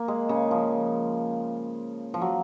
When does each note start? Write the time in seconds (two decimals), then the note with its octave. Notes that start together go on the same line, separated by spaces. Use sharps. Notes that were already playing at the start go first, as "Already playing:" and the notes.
Already playing: A#3
0.08 G#3
0.29 C#3
0.51 F3
2.14 F3
2.22 F#3